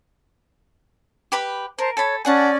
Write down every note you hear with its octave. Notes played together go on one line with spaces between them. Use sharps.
G4 B4 B5
A#4 C5 A5 A#5
A4 C#5 A5 B5
C#4 G#4 D5 F#5 A5